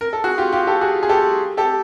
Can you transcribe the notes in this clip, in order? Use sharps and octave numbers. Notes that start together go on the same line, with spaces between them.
A#4
A4
F#4 G#4
F4 G4
F4 G4
G4 A4
F#4 G#4
G#4
G4 A4
G4 A4